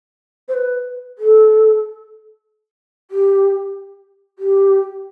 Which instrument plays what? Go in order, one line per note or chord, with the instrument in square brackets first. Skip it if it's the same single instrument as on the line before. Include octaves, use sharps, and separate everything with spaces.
[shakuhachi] C5
B4
A4
G4
G4